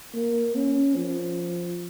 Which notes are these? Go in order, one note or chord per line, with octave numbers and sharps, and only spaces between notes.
A#3
C#4
F3